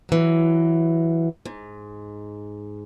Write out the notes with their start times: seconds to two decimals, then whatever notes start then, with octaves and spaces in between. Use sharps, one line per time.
0.09 E3 F#3
1.46 G#2